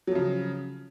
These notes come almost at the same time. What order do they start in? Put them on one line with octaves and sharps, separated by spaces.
F#3 F3 C#3